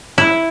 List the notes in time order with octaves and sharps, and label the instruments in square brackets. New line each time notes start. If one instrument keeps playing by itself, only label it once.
[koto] E4